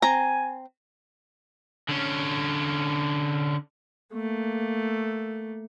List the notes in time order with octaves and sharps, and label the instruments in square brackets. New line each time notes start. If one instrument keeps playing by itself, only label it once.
[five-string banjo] C4 A#5 [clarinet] G#5
[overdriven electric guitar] D3 C#4
[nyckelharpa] A3 A#3